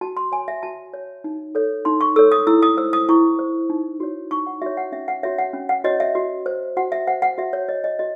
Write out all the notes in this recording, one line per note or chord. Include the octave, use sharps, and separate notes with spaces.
F#4 A5
C6
C#5 G#5
E5
F#4 A5
C#5
D#4
A4 C#5
D#4 C6
C#6
A4 C#5 E6
D#6
E4 E6
D#6
C5 E6
D#6
E4 C#6
C5
D#4
F#4 C#5
D#4 C#6
F#5
F#4 C#5 E5
F#5
C#4 E5
F#5
F#4 C#5 E5
F#5
C#4
F#5
F#4 C#5 D#5
E5
F#4
C5
F#4 F#5
E5
C5 F#5
F#5
F#4 E5
C#5
C#5 D#5
D#5
F#4 D#5